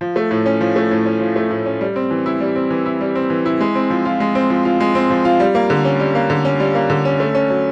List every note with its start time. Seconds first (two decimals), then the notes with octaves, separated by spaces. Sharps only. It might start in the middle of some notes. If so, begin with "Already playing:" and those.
0.01 F3
0.16 A3
0.31 A2
0.46 C#4
0.61 F3
0.76 A3
0.91 A2
1.06 C#4
1.21 F3
1.36 A3
1.50 A2
1.66 C#4
1.81 G3
1.96 C4
2.11 E3
2.26 E4
2.41 G3
2.55 C4
2.70 E3
2.86 E4
3.01 G3
3.15 C4
3.30 E3
3.46 E4
3.61 G#3
3.75 C4
3.90 F3
4.05 F4
4.20 G#3
4.35 C4
4.50 F3
4.65 F4
4.80 G#3
4.95 C4
5.10 F3
5.25 F4
5.40 G3
5.55 A#3
5.70 D3
5.85 C#4
6.00 G3
6.15 A#3
6.30 D3
6.45 C#4
6.60 G3
6.75 A#3
6.90 D3
7.05 C#4
7.20 A3
7.35 C#4
7.50 F#3